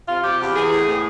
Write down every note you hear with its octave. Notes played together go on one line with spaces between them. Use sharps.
C3 F4
C3 G4
E2
E3 G#4
A2
A2